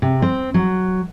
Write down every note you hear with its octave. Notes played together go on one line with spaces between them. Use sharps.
C3
C4
F#3